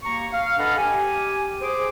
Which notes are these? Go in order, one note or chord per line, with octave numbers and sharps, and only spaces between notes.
D#2 A#3 A#5 C#6
F5
G2 A4 D#5 F#5 B5 F6
G4 G#5
G#4 C5 D6